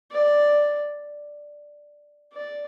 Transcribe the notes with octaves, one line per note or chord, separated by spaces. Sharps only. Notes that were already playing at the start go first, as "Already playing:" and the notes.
D5
D5